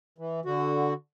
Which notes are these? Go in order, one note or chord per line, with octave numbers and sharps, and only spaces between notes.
E3
D3 F#4